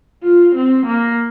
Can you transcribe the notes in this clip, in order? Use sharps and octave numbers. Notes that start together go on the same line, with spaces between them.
F4
C4
A#3